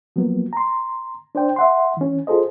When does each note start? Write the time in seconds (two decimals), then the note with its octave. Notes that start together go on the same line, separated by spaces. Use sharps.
0.16 F3 F#3 A#3 B3
0.53 A#5 C6
1.35 D4 C5 D5 G5
1.56 E5 F#5 C6
1.97 E3 C#4
2.27 F4 G#4 A4 C5 D#5